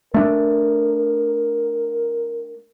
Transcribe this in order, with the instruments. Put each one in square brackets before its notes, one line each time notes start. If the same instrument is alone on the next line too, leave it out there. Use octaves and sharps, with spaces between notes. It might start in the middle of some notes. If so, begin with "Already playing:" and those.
[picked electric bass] A3 D4 [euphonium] A#4